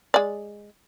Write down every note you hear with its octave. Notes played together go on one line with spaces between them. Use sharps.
G#3 D5